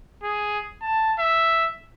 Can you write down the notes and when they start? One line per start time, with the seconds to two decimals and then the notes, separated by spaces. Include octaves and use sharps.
0.23 G#4
0.82 A5
1.19 E5